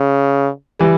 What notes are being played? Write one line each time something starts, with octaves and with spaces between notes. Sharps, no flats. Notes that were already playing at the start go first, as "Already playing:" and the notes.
Already playing: C#3
E3 G3